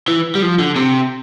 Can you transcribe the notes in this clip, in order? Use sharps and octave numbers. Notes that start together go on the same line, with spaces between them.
E3
G3
F3
D3
C3